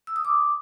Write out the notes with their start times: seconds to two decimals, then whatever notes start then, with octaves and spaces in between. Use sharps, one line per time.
0.07 E6
0.16 D#6
0.25 D6